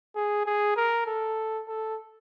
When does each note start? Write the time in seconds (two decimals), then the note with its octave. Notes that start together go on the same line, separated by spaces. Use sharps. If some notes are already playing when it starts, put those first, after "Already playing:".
0.16 G#4
0.46 G#4
0.77 A#4
1.07 A4
1.68 A4